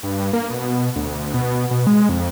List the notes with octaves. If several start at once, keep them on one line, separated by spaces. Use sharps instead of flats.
G2
A#3
B2
D2
B2
B2
G#3
F2